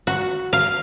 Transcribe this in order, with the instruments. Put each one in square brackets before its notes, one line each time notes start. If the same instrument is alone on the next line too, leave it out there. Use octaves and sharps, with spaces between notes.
[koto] F#4
F5